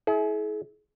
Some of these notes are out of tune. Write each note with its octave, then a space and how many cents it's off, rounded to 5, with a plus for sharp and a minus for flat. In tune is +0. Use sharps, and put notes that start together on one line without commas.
E4 -20 G#4 +40